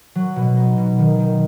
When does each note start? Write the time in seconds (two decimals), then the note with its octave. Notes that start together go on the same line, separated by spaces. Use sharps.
0.15 F#3
0.36 B2
0.57 D#4
0.78 B2
0.98 D#3
1.19 D#3